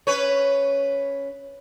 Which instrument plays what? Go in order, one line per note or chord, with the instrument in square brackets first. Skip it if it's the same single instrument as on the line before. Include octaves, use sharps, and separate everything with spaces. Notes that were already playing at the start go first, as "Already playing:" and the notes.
[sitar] C#4 B4 C#5